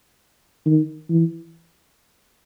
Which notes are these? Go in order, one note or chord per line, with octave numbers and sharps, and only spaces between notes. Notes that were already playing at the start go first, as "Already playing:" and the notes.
D#3
E3